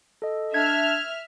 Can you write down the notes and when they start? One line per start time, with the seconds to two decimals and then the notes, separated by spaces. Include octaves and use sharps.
0.22 A4 D#5
0.54 D4 E5 F6 G#6